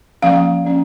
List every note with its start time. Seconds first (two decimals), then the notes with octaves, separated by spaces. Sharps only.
0.22 F3 A#3 C#4 F5
0.65 F3 A#3 C#4